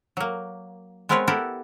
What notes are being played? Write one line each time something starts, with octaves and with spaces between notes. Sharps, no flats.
F#3 A#3
G#3 B3 C4 A#4 B4 C#5
B3 E4 G4 A4 A#4 F#5